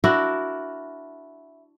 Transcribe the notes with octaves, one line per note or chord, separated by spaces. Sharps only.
D4 E4 F#4 A#4